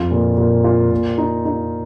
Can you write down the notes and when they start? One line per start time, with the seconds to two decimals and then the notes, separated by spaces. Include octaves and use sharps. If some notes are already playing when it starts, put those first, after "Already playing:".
Already playing: F2 F4
0.11 A#2
0.37 A#2
0.64 F4
0.91 A#2
1.18 D#4
1.45 D#4